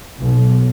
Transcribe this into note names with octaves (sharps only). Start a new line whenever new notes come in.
B1